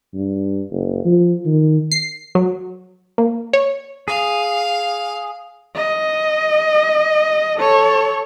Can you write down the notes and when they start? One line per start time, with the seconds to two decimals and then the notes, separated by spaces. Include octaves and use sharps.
0.14 G2
0.71 F#1
1.05 F3
1.46 D#3
1.92 C7
2.35 F#3
3.18 A#3
3.53 C#5
4.08 G#4 F5
5.76 D#5
7.57 A4 C#5